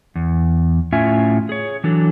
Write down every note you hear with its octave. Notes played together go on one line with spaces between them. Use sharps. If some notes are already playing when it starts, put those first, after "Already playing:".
E2
A2 C#4 F4 E5 G#5
G#4 C#5
E3 F#3 D4 A4